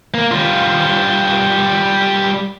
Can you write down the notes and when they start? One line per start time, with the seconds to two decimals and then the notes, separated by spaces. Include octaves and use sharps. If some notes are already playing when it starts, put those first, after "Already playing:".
0.14 A#3
0.31 G3 F4